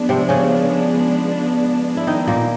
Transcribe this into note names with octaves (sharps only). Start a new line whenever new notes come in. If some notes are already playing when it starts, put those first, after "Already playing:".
Already playing: F3 G#3 B3 D4
C3 C4
C#3 C#4
E4
D#3 D#4
A#2 A#3